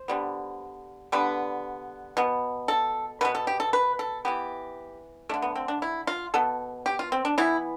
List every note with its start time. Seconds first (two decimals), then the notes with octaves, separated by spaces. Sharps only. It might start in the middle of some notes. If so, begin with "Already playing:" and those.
Already playing: C5
0.08 D3 G3 B3
1.12 D3 G3 B3 B4
2.17 B2 B3
2.68 A4
3.21 B2 B3 B4
3.35 A4
3.47 G4
3.60 A4
3.73 B4
3.99 A4
4.25 E3 B3 G4
5.29 A3 D4
5.34 D3
5.42 B3
5.56 C4
5.68 D4
5.82 E4
6.07 F4
6.34 B2 B3 A4
6.86 G4
6.99 F4
7.12 C4
7.25 D4
7.38 E3 B3 E4